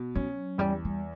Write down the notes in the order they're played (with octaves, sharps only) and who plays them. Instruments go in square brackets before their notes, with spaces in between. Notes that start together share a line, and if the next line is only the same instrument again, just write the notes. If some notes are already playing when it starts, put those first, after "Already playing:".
Already playing: [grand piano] B2
[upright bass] F#3 [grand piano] C#4
[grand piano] E2 [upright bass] G3
[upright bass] G3